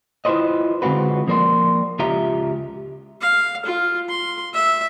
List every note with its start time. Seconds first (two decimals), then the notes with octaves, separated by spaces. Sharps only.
0.25 E4 F4 G#4 B4 C5 D#5
0.82 D3 G#3 C4 F4 F#4 B4
1.28 F3 A#3 A#4 D5 C6
1.99 C#2 F4 G4 E5 A#5
3.21 F5
3.66 F4
4.09 C6
4.53 E5